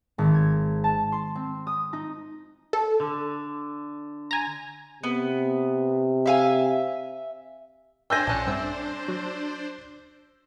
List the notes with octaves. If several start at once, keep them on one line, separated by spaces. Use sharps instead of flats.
G#1
G#6
A5
C6
C4
D#6
D#4
A4
D3
G#5 A#5
C3 B3
E5 F5 G#5
D4 C5 G5 G#5 E6 G6 A#6
A#1 C#4 A4 F#5 C#7
G2 C4 E5
F#3